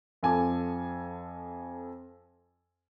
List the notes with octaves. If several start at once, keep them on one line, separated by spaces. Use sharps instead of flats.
F2 F3 A4 G#5 D6